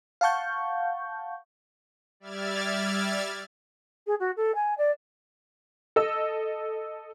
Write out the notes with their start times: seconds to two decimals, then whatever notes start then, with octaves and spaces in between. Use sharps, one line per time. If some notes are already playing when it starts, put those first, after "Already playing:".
0.21 F5 F#5 A5 C#6 G6
2.20 G3 D5 E5 F6 G#6 A6
4.07 G#4
4.20 F#4
4.36 A4
4.55 G#5
4.78 D5
5.96 A4 D#5 E6